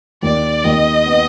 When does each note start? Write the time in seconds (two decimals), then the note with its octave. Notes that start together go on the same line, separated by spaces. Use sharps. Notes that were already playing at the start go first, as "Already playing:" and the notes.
0.23 D#2 D5
0.64 D#2 D#5
1.06 B3